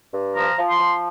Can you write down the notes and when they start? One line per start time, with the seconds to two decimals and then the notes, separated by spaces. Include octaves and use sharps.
0.12 G2
0.34 F3 A#5
0.57 F3
0.68 C6
0.80 F3